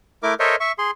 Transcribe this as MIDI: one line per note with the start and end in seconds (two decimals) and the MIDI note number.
0.23 0.34 57
0.23 0.34 64
0.23 0.34 70
0.23 0.34 86
0.40 0.56 69
0.40 0.56 70
0.40 0.56 72
0.40 0.56 73
0.40 0.56 75
0.40 0.56 76
0.60 0.72 76
0.60 0.72 85
0.78 0.91 68
0.78 0.91 84